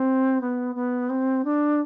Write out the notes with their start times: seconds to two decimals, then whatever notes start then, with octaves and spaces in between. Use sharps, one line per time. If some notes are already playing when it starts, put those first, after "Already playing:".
Already playing: C4
0.41 B3
0.75 B3
1.10 C4
1.45 D4